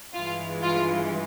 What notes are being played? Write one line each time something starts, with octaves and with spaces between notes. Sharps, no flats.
G2 E3 G#3 F4
F4